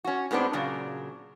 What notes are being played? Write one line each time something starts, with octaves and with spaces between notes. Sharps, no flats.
C#4 F#4
A2 G#3 B3 C4 D4
A#2 C#3 F#3 D4